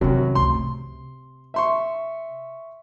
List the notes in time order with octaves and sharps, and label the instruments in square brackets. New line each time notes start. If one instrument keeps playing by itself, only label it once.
[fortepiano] C2 F#2 F#3 [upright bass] C3 D#3
[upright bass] C#2 A3 [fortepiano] C6
[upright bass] C3
[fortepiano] E5 C6 C#6